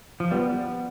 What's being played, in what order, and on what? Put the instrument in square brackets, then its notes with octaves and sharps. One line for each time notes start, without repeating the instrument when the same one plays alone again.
[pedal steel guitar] F3
[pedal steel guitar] G3 [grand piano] B3